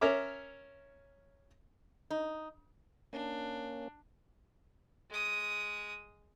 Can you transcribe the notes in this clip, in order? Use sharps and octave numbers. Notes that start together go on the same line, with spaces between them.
C#4 A#4 C#5 E5 D6
D#4
A#3 C#4 D4
G#3 D#6